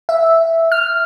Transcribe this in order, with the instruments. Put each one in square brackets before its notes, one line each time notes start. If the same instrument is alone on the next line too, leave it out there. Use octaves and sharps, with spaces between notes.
[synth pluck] E5
F6